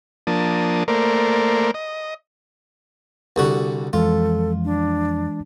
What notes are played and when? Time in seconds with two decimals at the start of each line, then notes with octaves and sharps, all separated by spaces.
0.27 F3 A#3 D4 A5 D#6
0.88 A3 A#3 A#4 C5 D5
1.74 D#5
3.36 C2 D3 F#4
3.93 F2 E3 G#3 F4 A4
4.65 D4